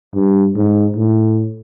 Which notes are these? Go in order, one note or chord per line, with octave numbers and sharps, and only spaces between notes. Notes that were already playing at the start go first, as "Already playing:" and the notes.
G2
G#2
A2